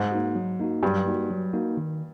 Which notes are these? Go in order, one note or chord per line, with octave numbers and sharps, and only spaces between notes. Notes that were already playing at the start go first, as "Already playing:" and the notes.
Already playing: G#2
A#3 D#4 F#4
F#3
A#3 D#4 F#4
G2 F#3
A#3 D#4 F#4
F#3
A#3 D#4 F#4
D#3